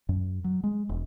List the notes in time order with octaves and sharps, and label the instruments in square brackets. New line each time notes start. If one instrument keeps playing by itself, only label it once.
[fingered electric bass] F#2
F#3
G#3
E1